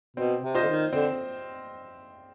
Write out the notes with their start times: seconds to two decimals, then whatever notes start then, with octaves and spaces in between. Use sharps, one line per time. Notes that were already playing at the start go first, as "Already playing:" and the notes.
0.16 B2 C4
0.42 C3
0.55 F4 C5 D#5
0.62 D3
0.68 D#3
0.93 D3 C4